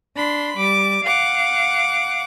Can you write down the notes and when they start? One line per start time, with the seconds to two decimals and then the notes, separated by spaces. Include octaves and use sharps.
0.15 D4 B5 C6
0.57 G3 D6
1.04 F5 F#5 D6